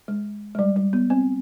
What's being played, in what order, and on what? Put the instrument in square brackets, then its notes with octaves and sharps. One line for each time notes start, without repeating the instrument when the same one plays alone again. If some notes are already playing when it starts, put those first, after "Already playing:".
[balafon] G#3
G#3
G3
G3
B3
C4